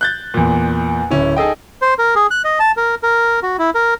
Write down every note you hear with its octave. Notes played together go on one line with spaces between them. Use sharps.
F#6 G6 A6
E2 A#2
D1 C#4 E4
D#4 G#4 A4 D#5 G5
C5
A#4
G#4
F#6
D#5
A5
A#4
A#4
F#4
E4
A#4